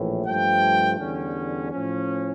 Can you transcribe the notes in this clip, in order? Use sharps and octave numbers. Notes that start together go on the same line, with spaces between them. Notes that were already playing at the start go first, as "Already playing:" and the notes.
Already playing: A#1 A2 E3
G2 F3 A3 G5
E2 D3 G3 C#4
A2 F3 C#4